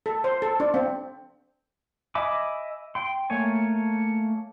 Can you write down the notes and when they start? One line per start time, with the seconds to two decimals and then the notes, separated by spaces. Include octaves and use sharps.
0.06 A4
0.24 C5
0.42 A4
0.60 D4
0.74 C4
2.15 D#5 E5 G#5 B5 D6
2.95 G5 C6
3.30 A3 A#3 C#5 G#5